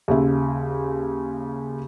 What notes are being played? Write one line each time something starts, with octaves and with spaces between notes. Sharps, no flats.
D#2 C#3 E5